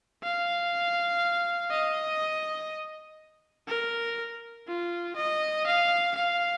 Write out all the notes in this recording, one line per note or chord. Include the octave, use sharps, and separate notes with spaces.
F5
D#5
A#4
F4
D#5
F5
F5